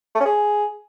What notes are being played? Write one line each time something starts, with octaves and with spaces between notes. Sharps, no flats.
A3
C#4
G#4